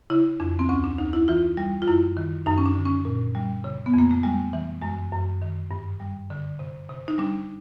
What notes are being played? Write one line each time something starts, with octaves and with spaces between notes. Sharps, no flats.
C#3 E4
F2 D4
C4
D2 C#4
D4
D2 D#4
E4
E3 F4
G3
F4
F#2 E4
D#3
F#2 D#4
C#4
D4
D3
C#4
A#2
G3
C#3
B3
F2 A#3
A3
G3 G#3
E3
F#2 G#3
F#2
D#3
G2
G3
D3
C3
C3
D#4
G3 D4